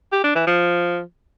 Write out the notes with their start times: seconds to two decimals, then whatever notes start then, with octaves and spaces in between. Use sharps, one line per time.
0.12 G4
0.24 D4
0.35 E3
0.47 F3